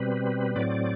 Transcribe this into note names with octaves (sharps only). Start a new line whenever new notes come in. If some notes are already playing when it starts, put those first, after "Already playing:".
Already playing: B2 G3 C4 B4
A2 F#3 C4 D5